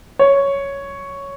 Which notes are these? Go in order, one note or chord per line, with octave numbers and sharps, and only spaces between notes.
C#5